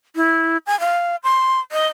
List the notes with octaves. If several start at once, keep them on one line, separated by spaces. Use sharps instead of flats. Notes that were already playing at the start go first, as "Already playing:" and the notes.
E4
G#5
F5
C6
D#5